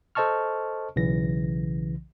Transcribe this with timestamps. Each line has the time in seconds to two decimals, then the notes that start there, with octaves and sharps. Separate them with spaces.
0.15 A4 C5 D#5 A5 C#6 F6
0.96 B1 C#3 E3 A#6